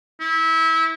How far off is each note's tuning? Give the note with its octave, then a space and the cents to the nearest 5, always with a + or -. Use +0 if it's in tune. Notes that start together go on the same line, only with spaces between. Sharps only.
E4 -25